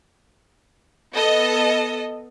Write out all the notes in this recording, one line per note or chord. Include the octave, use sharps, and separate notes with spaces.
B3 A4 D#5